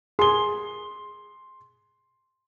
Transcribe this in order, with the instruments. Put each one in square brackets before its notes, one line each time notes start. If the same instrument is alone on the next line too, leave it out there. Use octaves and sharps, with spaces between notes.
[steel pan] G#4 [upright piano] C6 G7